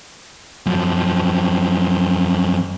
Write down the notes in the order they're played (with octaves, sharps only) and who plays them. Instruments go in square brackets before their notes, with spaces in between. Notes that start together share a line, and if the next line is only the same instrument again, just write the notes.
[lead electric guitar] F#2 F3